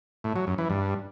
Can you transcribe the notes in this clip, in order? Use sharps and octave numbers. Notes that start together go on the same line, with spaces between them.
A2
F#3
F#2
E3
G2